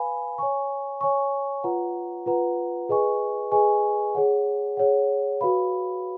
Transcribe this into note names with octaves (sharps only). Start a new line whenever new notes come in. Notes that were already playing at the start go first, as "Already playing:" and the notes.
Already playing: B4 F5 G#5 B5
C#5 G#5 C#6
C#5 G#5 C#6
F4 B4 F#5 A#5
F4 B4 F#5 A#5
G#4 B4 D#5 G#5 C#6
G#4 B4 D#5 G#5 C#6
G#4 C#5 F#5
G#4 C#5 F#5
F#4 B4 F5 B5